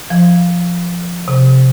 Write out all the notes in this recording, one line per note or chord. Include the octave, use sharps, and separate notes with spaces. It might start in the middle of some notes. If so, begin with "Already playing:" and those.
F3
C3